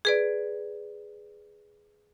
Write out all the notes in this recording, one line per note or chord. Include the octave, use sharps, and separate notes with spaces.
G#4 B4 D5